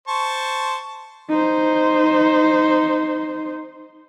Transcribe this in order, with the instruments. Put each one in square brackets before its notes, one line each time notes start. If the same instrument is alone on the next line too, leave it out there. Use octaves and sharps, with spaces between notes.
[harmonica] C5 A5 C#6
[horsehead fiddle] D#4 C5